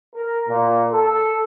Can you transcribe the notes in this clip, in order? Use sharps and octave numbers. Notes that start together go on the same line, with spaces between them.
A#4
A#2
A4